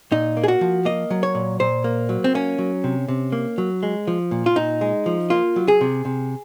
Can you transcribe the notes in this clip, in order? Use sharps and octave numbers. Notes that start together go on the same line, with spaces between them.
A#2 D#4
A#3
G#4
F#4
F3
A#3 D#5
F#3
C#5
A#2
A#2 C5
A#3
F#3
C4
A#3 C#4
F#3
C3
C3
A#3
F#3
G#3
F3
A#2
F4
A#2 D#4
G#3
F3
A#3 F4
F#3
G#4
C3
C3